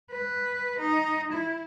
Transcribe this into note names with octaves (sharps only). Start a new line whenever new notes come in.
B4
D#4
E4